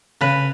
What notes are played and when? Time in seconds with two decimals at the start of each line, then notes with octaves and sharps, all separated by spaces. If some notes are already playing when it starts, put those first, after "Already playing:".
0.21 C#3 B4